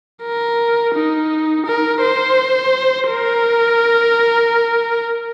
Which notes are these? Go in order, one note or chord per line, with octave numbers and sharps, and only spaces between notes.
A#4
D#4
A#4
C5
A#4